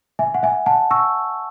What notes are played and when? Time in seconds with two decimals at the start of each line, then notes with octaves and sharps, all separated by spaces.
0.19 E5 G#5
0.34 F#5
0.43 E5 G#5
0.66 F#5 A5
0.91 C#6 E6